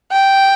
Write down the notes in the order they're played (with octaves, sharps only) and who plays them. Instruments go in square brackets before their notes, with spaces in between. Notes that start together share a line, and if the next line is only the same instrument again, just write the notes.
[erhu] G5